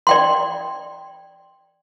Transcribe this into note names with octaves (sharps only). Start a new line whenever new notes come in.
D5 G5 C6